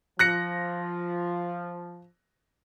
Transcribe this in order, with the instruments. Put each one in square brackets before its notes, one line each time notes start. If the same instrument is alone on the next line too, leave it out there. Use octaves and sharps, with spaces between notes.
[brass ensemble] F3 [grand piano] F#6 A#6 C#7